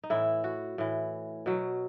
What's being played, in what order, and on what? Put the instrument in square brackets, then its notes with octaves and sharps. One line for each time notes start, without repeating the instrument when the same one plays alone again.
[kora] D#4
A2 E3 E4
F#4
A2 E3
B2 F#3